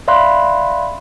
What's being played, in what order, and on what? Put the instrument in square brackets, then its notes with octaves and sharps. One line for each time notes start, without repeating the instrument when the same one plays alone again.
[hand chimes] D5 E5 F5 B5 C6 F#6